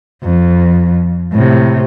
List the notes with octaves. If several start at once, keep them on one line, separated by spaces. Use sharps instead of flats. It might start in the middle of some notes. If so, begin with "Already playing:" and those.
F2
A2 C3